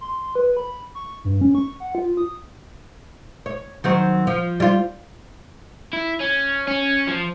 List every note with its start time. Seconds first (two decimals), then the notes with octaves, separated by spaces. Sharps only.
0.01 C6
0.35 B4
0.57 B5
0.95 C#6
1.25 G2
1.41 C#4
1.55 C#6
1.80 F#5
1.95 F4
2.17 D#6
3.46 C#5
3.84 D#3 F#3 C4
4.27 F3
4.60 G3 F4
5.93 E4
6.20 C#4
6.67 C#4
7.07 F3